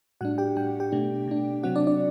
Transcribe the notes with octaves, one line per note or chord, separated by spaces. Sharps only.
A2 G3 D4 F#4 F#5
G4 G5
A2 G3 D4 G5
G4 G5
B2 A3 D4
B2 A3 D4
C3 F#3 C4 F#4 F#5
D4 D5
D4 D5